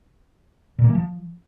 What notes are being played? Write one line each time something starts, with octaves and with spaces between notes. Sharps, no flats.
A#2
A#3
E3
F3